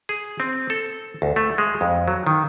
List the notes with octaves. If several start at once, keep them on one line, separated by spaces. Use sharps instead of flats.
G#4
C4
A4
D2
A3
G#3
F2
F#3
D#3